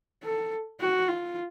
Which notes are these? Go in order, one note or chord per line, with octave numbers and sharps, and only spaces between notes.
A4
F#4
F4